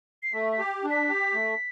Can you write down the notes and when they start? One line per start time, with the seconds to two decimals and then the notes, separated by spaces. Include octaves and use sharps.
0.23 C7
0.34 A3 B6
0.52 B6
0.59 G4
0.84 D4
0.91 B6
1.09 G4
1.34 A3